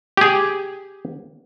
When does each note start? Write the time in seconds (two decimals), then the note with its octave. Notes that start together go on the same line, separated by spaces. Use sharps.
0.17 G4 G#4